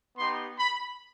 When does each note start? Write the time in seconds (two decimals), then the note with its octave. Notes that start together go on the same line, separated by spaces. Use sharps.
0.17 B3 D#4 G4 C6
0.57 B5